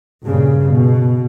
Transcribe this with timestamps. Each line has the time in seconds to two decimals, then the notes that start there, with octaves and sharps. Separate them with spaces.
0.25 G2 A#2 C#3
0.69 B2